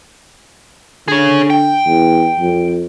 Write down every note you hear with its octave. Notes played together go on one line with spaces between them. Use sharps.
D3 G#4 C#5
G5
E2
F2